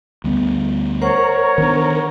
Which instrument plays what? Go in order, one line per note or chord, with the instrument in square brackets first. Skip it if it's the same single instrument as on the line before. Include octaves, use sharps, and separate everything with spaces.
[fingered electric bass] D2 G3 B3
[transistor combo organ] A#4 [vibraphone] C5 F#5 C#6 [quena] C#5
[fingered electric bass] D#3 B3 D4